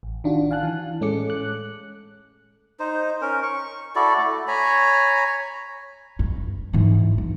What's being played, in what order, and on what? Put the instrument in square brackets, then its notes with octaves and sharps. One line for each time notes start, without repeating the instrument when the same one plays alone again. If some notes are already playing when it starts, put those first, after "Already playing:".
[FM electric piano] A1
D#3 D4 F4 F#4
F5 G#5 A5 F#6
E3
A2 G#3 C#4 A4 D6 C#7
F#6
[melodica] D#4 C5
C#4 A#4
C#6
E4 F#4 A4 D5
A3
C#5 G#5 A#5 B5
[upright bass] G2
G#2 E3
E3